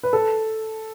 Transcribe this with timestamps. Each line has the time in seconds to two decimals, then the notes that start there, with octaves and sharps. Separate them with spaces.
0.03 B4
0.13 A4